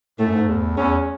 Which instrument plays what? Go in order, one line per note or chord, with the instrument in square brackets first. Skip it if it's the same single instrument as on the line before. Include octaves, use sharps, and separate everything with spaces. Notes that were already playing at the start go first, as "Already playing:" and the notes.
[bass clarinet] A2 [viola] A3
[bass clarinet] F#2
G#2
E2
[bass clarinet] E2 [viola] C#4